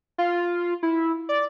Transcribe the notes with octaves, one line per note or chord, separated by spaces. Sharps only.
F4
E4
D5